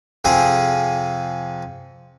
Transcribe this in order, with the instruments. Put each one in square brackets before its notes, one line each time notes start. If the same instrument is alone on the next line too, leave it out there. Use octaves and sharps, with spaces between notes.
[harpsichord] F2 C3 G#4